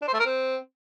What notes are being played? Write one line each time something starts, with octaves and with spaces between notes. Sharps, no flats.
D4
C5
A3
A#4
C4